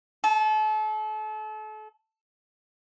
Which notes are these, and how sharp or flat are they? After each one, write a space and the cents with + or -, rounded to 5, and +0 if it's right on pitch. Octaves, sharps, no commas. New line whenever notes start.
A4 -35